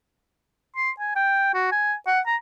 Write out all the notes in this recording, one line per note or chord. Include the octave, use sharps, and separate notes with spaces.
C6
G#5
G5
F#4
G#5
F#5
A#5